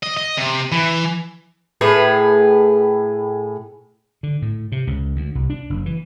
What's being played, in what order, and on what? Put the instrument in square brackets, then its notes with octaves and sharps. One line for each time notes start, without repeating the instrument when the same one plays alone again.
[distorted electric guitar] D#5
D#5
C3
E3
[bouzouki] A2 G#4 B4
[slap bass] D3
A2
C3
C#2
D2
C2
D4
F#1
E3